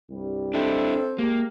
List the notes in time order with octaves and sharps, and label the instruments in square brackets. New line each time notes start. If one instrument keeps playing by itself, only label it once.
[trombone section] C2 G2 G3
[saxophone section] C4 A4 [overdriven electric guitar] D4 E4
[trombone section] G#3 G4 [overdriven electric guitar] A#3